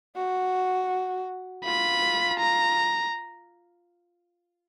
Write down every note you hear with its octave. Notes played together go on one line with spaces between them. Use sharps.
F#4
F4 B5
A#5